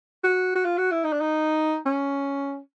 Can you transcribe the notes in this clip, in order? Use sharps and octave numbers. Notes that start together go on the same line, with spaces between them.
F#4
F#4
F4
F#4
E4
D#4
D4
D#4
C#4